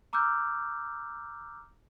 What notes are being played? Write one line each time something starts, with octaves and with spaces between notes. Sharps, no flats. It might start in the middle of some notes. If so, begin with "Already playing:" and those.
A#5 D6 E6 F6 G6